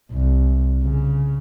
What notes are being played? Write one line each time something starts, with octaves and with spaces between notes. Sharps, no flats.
C2
C#3